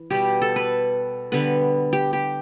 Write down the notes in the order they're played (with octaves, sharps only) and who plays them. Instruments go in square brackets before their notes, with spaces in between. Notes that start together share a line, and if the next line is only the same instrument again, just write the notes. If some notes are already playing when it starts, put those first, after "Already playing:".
Already playing: [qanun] E3
B2 G3 B3 G4
A4
B4
D3 G3 B3 B4
G4
G4